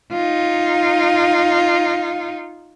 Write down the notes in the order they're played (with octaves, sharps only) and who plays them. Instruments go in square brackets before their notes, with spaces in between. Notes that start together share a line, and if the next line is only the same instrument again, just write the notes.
[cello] D#4 F4